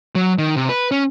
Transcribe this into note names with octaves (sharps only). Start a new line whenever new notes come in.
F#3
D#3
C3
B4
C#4